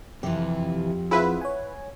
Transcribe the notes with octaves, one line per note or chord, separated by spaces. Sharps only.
F2 C3 E3 G4
C4 E4 F4 G#4 B4 E5 F#5
C#5 G#5